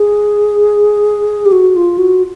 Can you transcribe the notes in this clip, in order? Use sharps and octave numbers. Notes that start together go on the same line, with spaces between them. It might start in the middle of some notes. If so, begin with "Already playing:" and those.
Already playing: G#4
G4
F#4
F4
F#4